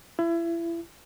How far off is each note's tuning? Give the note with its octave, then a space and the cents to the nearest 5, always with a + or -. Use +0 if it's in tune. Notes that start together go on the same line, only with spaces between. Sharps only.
E4 +30